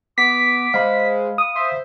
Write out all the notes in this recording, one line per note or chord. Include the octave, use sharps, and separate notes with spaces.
B3 D6 B6
G#3 C5 F5 B5
D#6
C5 E5